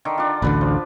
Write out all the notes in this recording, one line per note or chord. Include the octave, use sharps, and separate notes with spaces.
D3 D#3
D4 F4
A1 D2 D3 B4
F3